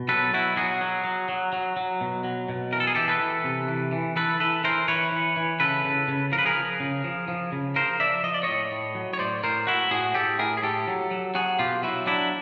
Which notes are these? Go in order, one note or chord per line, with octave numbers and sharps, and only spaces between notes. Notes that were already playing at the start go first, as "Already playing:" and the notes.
Already playing: B2
F#3 A4 B4
B2 E4 F#4
F#3 F#4 G#4
F#3
F#3
F#3
F#3
F#3
B2
F#3
B2
E3 A#4
A4
G#4
E3 G4 A4
A4 B4
E3
C3
E3
E3
E3 A4 B4
E3 A4 B4
E3 A#4 C5
E3 B4 C#5
E3
E3
C#3 A4 B4
C#3
C#3
F3 A#4
B4
G#4 A#4
F3
C#3
F3
F3
C#3
F3 A#4 C5
F3 D5 E5
F3 D#5
D5
A2 C#5 D#5
A2
F#3
C#5
A2 C5 D5
A2 A#4 C5
A2 E4 F#4
A2 F#4 G#4
A2 G4 A4
A2 G#4 A#4
G#4
A2 G4 A4
F#3
F#3
F#3 F#4 G#4
B2 F4 G4
F#3 E4 F#4
F#3 D4 E4